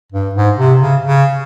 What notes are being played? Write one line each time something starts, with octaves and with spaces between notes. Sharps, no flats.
G2
G#2
C3
C#3
C#3